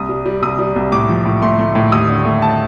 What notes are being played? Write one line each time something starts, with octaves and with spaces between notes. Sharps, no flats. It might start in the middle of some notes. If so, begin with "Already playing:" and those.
Already playing: C2 D#6
G3
G3
C2 D#6
G3
C2
A2 D6
F3
A2
A3 C6
A3
A2
D#2 D#6
D3
A3
A5